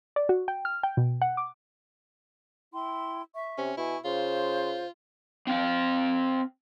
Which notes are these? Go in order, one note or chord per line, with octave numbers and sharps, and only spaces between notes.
D5
F#4
G5
F6
G5
B2
F#5
D6
E4 G5 C6
E5 C#6
C3 C#4
B2 E4 G#5 C#6
C#3 F4 C5
C4 F5